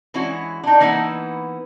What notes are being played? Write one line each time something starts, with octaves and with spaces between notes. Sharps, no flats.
E3 G#3 C#4 E4 F#4
D4 D#4
E3 A#3 B3 D#4 E5 F#5